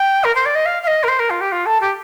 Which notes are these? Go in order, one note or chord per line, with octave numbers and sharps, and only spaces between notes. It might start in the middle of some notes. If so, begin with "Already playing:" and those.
Already playing: G5
A#4
C5
D5
D#5
F5
F5
D#5
A#4
C5
A#4
F4
G4
F4
A4
G4